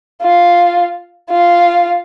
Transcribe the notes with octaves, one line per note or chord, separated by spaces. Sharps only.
F4
F4